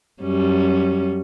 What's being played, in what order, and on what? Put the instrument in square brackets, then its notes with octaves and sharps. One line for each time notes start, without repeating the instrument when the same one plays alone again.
[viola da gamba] F#2 G3 C#4